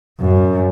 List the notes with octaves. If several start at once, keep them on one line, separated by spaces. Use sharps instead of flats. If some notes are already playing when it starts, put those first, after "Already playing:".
F#2